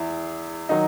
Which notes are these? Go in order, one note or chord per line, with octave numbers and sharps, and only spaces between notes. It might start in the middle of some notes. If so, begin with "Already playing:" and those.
Already playing: E2 E4
D#3 F#3 D#4